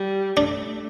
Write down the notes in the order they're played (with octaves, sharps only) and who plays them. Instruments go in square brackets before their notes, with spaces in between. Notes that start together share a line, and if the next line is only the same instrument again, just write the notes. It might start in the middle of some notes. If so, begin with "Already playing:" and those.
Already playing: [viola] G3
[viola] A3 [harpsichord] D4